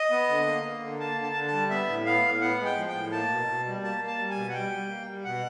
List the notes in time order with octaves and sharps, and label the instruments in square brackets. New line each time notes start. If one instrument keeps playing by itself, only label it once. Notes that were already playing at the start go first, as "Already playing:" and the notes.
Already playing: [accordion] D#5
B3
D3
A#3
A#3
D3
A#3 A5
D3
A5
D3
A5
G3
B3 E5
A2
B3 F5
A2
B3 F#5
G#3
G5
F3
G5
A2
A#3 A5
B2
B2
G3
A#3 A5
A#3
A5
G3
G#5
B2
F#5
G3 G5
G3
A#3
G3
B2 F#5